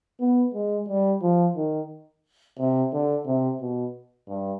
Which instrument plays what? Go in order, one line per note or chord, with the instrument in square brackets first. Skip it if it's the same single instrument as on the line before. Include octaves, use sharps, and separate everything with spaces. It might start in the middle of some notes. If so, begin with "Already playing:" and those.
[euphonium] B3
G#3
G3
F3
D#3
C3
D3
C3
B2
G2